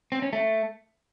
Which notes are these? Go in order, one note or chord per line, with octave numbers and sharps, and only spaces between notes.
C4
C#4
A3